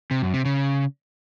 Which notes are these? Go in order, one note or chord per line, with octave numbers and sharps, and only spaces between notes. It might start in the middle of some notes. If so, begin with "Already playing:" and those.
C3
F#2
C3
C#3